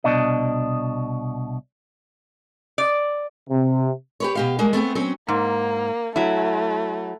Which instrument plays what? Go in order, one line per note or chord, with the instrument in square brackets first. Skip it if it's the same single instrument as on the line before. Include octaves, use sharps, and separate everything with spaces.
[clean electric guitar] C2 B2 D4 D#5
[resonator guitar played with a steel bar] D5
[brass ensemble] C3
[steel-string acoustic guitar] G4 B4 C#5
B2 G4 F5
G3 G#3 A#3
A3 B3 C4 G#4
F#3 C4 C#4
[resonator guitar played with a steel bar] G#2 [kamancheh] A#3
[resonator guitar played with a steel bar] F#3 E4 [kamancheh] A3